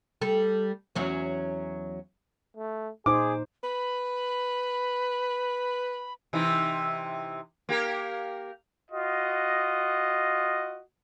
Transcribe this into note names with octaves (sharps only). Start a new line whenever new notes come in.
G3 A4
E2 F#3 C#4
A3
A#2 D#4 G#4 C5 D6
B4 B5
C3 E3 D#4
A#3 G4 A#4
F4 F#4 D#5